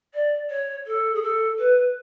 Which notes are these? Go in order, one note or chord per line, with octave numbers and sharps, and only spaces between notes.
D5
C#5
A4
G#4
A4
B4